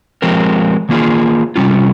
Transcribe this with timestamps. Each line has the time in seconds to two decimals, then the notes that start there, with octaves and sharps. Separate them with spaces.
0.22 F3 G#3 C4 G4 A#4
0.89 D#3 A#3 F4 G#4
1.56 C3 G3 C#4 F4